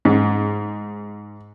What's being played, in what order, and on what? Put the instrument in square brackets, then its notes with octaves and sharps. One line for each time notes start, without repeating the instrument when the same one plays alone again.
[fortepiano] G#2